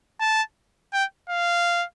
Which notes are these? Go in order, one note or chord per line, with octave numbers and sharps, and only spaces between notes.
A5
G5
F5